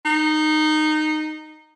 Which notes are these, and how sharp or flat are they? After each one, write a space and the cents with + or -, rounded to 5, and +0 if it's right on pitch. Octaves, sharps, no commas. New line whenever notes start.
D#4 -15